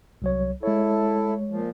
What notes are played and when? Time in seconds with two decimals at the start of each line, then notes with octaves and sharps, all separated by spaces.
0.22 C2 F#3 C#5
0.63 G#3 E4 A4 C#5
1.50 A#2 F3